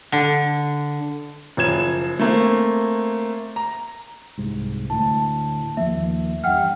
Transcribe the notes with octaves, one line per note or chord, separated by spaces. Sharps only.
D3
F#1 F3 G#6 E7
A3 A#3 C4
A#5
C2 G#2
D2 A2 A5
D#2 F3 A#3 E5
E2 G2 F#5 G5 F6